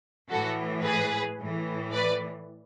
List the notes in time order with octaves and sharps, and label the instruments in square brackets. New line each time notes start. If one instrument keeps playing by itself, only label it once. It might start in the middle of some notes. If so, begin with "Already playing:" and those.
[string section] A2 E3 F#4 A4
G#4 B4
A2 E3
B4 D5